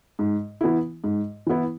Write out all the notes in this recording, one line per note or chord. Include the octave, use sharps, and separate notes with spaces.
G#2
E3 B3 E4
G#2
E3 B3 E4